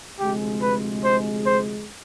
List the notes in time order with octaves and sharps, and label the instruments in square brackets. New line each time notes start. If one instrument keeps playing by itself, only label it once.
[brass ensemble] D2 C3 F3 G#3 [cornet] G4
[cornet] B4
C5
C5